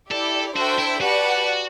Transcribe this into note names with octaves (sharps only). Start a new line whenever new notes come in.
E4 G4 A4 D5
D4 F#4 A4 C5 E5 G5
E4
F#4 G4 B4 D5 F#5 A5